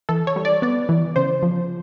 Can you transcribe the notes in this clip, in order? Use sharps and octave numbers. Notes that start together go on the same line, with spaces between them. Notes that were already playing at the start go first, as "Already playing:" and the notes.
E3 A4
C#5
G3
D5
B3 D5
E3
C#3 C5
F3